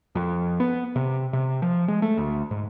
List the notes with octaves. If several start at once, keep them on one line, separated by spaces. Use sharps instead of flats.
F2
B3
C3
C3
F3
G#3
A3
D2
G#2